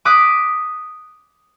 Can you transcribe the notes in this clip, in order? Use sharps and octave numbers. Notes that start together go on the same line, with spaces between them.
D6 D#6 F#6 B6